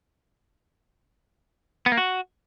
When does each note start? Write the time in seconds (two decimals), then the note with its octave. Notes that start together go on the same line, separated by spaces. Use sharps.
1.86 B3
1.92 A#3
1.98 F#4